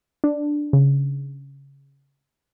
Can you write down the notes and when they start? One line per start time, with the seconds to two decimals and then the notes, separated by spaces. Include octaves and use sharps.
0.24 D4
0.73 C#3